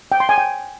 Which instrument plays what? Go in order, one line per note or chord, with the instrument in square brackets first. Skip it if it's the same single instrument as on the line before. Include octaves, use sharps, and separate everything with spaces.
[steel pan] G5
C6
G#5
G5